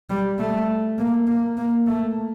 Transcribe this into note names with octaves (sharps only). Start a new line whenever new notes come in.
G3
A3
A#3
A#3
A#3
A3